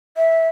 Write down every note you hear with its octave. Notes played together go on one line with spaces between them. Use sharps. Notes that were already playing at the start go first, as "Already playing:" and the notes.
E5